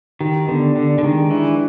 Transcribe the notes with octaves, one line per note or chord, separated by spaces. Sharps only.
D#3 G4
D3 B3
D3 D4
D3
D#3 G#3
E3 D4